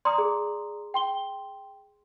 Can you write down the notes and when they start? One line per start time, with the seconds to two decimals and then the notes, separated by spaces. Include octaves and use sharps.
0.05 D5 A#5 C6 D#6
0.18 G#4
0.94 G5 C6 G7